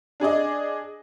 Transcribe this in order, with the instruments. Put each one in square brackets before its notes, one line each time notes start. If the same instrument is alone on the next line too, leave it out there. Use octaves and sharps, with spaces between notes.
[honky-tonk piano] D4 G#4 D5 D#5